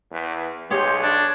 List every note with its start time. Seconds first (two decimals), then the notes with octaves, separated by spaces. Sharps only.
0.11 E2 B4
0.70 B1 G4 G#4 C#5 C6 G6
1.02 D4 G#6